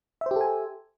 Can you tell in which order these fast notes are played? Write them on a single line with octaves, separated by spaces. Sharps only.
E5 C5 G4 A4 G#5